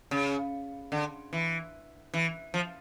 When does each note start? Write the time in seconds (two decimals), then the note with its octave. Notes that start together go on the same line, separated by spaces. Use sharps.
0.11 C#3
0.92 D3
1.33 E3
2.14 E3
2.54 F3